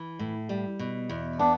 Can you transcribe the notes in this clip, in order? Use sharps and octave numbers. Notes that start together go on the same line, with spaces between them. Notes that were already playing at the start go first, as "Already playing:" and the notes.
Already playing: E3
A2
G3
B2
E2
B3 D4